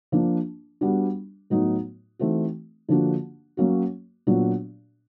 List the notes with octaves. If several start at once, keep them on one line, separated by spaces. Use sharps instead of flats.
F3 A#3 D4
G3 B3 D4 F#4
A2 F#3 B3 D#4 F#4
E3 A3 C4 D#4 F#4
D3 F3 A#3 D4 F#4
F#3 A#3 C#4 F#4
A#2 F#3 B3 D4 F#4